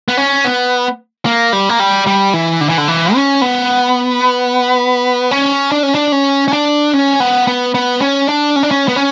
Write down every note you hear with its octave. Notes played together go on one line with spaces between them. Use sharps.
B3
C#4
B3
A#3
G3
A#3
G3
G3
E3
D3
E3
D3
E3
C#4
B3
C#4
D4
C#4
D4
C#4
C#4
D4
C#4
B3
B3
B3
C#4
D4
C#4
D4
C#4
B3
C#4